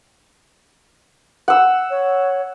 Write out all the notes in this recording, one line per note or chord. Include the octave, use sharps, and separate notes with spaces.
F#5 E6
C#5